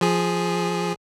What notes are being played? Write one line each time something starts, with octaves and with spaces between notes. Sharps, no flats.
F3 G#4